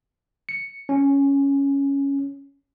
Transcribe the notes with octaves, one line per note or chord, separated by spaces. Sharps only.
C#7
C#4